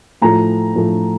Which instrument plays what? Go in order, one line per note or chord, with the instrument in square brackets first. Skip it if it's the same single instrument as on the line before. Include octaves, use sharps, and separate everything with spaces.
[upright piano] A2 F3 A3 A#5
A2 F3 A3